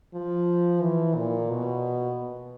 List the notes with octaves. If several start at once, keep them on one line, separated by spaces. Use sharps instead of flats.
F3
E3
A#2
B2